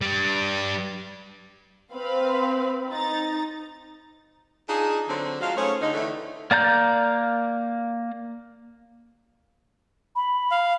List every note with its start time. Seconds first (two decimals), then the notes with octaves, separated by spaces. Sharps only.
0.01 G3 D4
1.93 C4 B4 F5 B5
2.90 D#4 A#5 A6
4.68 D4 D#4 F4 G#4
5.08 D3 F#3 C4
5.41 F3 F#3 G#3 F5
5.57 G#2 A3 C#4 G#4 C5 C#5
5.81 D3 D#4
5.94 A2 D3 E3 A3
6.51 A#3 D5 A#5 G6
10.16 B5
10.51 F5